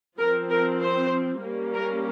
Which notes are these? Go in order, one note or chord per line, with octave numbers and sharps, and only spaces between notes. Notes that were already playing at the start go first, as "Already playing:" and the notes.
F3 C4 A#4
A#4
C5
G3 A#3 C#4
A#4